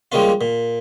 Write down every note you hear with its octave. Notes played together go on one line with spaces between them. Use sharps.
F3 G3 G#3 A#3 C#4 F4
A#2